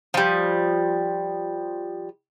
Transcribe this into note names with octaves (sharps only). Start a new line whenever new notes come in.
F3 G3